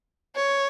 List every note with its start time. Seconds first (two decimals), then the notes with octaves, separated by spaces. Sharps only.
0.36 C#5